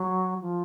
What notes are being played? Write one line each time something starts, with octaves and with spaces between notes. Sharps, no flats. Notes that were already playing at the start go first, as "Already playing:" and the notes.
Already playing: F#3
F3